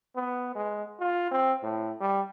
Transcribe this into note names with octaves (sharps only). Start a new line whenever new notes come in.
B3
G#3
F4
C4
A2
G3